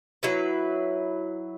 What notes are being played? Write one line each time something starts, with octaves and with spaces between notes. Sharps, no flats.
F#3 E4 B4 E5